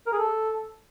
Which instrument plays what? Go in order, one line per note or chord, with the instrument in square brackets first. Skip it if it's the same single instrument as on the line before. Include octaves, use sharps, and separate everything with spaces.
[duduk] A#4
G#4
A4